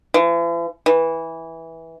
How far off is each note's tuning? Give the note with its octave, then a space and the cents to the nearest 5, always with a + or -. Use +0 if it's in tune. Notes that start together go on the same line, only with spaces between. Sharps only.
E3 +45
E3 -10